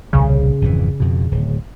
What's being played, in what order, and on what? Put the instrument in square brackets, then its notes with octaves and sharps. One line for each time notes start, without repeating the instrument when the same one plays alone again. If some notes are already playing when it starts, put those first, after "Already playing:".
[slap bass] D#1 C2 G3 [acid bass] C#3
[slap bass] G#1 F2 E3
F2 B2
D1